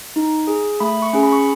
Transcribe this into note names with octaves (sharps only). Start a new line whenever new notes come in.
D#4
G#4
A3 B5
C#6
C#4 G#4
B5
C#6